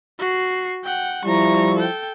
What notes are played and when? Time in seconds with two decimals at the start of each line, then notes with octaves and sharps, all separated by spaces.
0.19 F#4 C7
0.84 F#5 G5
1.25 F3 G3 E4 A#5 C#6
1.77 A4 G5